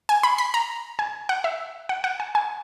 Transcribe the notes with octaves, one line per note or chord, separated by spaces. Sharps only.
G#5
B5
B5
A#5
G#5
F#5
E5
F#5
F#5
G#5
G#5